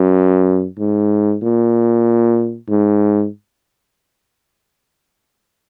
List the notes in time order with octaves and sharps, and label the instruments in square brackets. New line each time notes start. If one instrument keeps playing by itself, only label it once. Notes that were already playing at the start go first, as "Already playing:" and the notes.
Already playing: [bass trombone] F#2
G#2
A#2
G#2